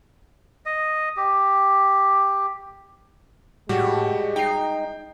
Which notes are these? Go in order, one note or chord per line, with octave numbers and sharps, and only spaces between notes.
D#5
G4
A2 G3 G#3 F#4 G4
D#4 G5 C7